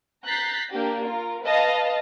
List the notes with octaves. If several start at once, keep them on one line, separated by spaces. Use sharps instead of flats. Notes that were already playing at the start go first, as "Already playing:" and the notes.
A#5 F#6 G6 A6 B6 C7
A#3 D4 G4
F4 A#4
B4 D#5 F5 A5